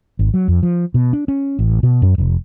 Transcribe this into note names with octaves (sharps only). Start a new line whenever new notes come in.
G#1
F#3
F2
F3
B2
D4
C#4
A1
B2
F#2
F1